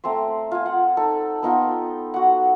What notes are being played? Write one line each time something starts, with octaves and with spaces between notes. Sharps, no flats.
A3 C4 A#5 C6
F4 G#5
F#5
D#4 A4
B3 D#4 F4 G5
F#4 F#5